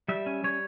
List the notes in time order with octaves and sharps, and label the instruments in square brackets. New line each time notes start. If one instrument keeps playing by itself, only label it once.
[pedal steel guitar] G3 E5
C#4
G3 C#5